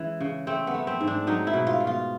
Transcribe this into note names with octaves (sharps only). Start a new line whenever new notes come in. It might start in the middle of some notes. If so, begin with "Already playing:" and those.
Already playing: E3 G#3 C#4
C#3
A3 C4
B3
A3
C4
G#2
D4
F#3 D#4
E4
B2
F4
B2
F4